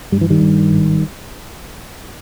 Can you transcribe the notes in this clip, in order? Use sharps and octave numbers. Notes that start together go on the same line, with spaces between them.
G2 G3
E3
D#3 G3
G2
G#1